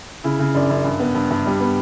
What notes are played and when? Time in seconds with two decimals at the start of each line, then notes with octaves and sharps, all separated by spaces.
0.24 C#3 E4
0.39 C#3
0.55 F#2 D4
0.70 F#2
0.84 G2
1.00 B3
1.14 G2
1.31 G2
1.46 G3
1.60 B3